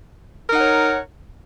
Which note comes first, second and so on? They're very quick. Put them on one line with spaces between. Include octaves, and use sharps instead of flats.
A#4 D#4 F#5 C#5